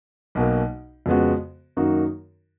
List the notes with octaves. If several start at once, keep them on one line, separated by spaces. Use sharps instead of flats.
B1 B2 A#3
F2 C#3 G#3 B3 F#4
F#2 D#3 A#3 D#4 F#4